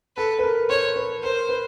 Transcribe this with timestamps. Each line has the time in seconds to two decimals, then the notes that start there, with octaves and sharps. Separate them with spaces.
0.17 A4 B4
0.39 B4
0.44 A#4
0.69 C5 C#5
0.96 B4
1.23 A#4 C5
1.49 B4